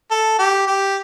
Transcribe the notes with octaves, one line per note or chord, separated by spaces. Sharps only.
A4
G4
G4